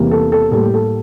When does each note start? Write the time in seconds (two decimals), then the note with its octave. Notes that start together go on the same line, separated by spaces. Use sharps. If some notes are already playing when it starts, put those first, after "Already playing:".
Already playing: E2 C3 E3 G3 A#3
0.11 A4
0.32 A4
0.51 A2 G3 A#3 A4
0.63 G4
0.74 A4